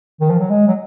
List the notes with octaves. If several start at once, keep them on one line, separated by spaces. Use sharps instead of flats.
D#3
F3
F#3
G#3
F#3